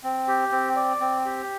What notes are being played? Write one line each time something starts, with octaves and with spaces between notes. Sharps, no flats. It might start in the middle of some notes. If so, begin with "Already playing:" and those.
C4
G4
C4
D5
C4
G4